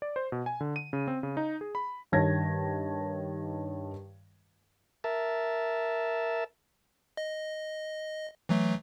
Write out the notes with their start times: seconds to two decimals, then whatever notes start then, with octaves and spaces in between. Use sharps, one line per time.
0.02 D5
0.16 C5
0.32 B2
0.46 G#5
0.61 D3
0.76 D#7
0.93 C#3
1.08 C4
1.23 C#3
1.37 D#4
1.61 G#4
1.75 B5
2.12 G2 D#3 C#5 A5 G#6 A#6
5.04 A#4 E5 A5
7.17 D#5
8.49 E3 F#3 A3